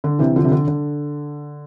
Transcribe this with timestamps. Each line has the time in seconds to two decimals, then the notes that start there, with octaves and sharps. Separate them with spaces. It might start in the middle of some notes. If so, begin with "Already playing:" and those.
0.04 D3
0.19 C3 E3
0.36 D3 F3
0.44 C3
0.52 D3
0.68 D3